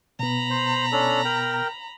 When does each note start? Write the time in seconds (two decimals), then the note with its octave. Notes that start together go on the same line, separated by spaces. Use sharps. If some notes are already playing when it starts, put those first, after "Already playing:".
0.19 B2 B3 A#5 B5
0.50 C5
0.92 C#4 D4 A4
1.25 A#4 G5